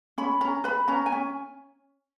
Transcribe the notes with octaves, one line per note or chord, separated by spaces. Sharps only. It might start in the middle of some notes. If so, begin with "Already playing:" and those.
C#4 B5
C#4 A#5
B4 B5
C#4 A#5
G#5
C#4